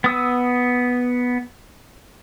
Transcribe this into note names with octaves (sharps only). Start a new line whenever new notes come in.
B3 D#6 E6